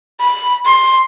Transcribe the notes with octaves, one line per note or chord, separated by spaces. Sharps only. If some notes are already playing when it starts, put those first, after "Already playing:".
B5
C6